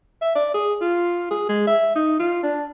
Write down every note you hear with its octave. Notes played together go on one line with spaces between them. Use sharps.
E5
D5
G#4
F4
G#4
G#3
E5
D#4
F4
D4